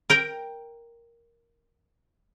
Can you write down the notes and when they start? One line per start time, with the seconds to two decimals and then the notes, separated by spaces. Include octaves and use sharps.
0.10 A#4 G5 A#5